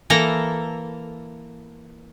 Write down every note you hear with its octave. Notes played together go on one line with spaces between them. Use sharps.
E3 A#3 A4 A#5